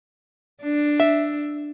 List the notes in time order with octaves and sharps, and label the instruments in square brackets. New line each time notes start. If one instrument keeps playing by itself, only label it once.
[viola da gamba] D4
[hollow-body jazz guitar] E5